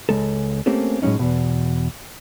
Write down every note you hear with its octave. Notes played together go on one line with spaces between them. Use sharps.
C#2 G#3 A4
A3 A#3 C4 C#4 G4 A4
A2 F#3 G#3 C#4 D#4
E2 B2